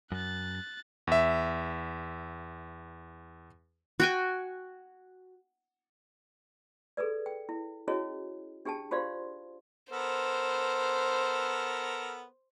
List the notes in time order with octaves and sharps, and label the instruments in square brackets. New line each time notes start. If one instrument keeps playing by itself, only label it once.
[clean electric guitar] F#2 [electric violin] F#6 A6
[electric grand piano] E2 E5
[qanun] F#4 G5 G#5
[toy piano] G#4 A4 B4 D5
G5
E4
C#4 E4 F#4 G#4 C#5 D#5
D4 G4 G#4 G5 A5
F4 G4 C5 D5 F5 C6
[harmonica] B3 A4 A#4 [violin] C5